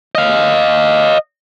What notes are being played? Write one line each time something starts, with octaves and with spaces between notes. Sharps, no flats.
D#5 F5